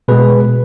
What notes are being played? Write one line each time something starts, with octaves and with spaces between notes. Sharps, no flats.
B2 G#3 G#4 B4